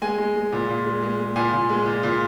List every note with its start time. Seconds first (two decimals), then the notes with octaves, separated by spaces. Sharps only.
0.02 G#3 G#5
0.18 G#3
0.36 G#3
0.52 A#2
0.69 A#2
0.85 G#3
1.02 G#3
1.19 G#3
1.36 A#2 G#5
1.52 A#2
1.69 G#3
1.86 A#2
2.03 A#2